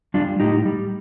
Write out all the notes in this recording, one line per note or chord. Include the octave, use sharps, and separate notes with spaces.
G3 D4 F4
A2 D#4 G4
G3